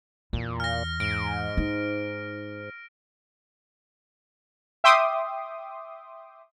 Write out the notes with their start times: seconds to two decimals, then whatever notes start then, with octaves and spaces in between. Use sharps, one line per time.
0.33 E2 A#2
0.60 F6 A#6
1.00 G#2 D7
1.57 D#4
4.84 E5 G5 C6 D6 D#6